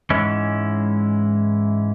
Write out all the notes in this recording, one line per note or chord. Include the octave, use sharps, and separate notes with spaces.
G#2 E3 G#3 C#4 E4